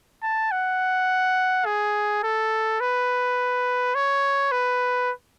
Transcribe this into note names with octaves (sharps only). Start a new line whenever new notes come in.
A5
F#5
G#4
A4
B4
C#5
B4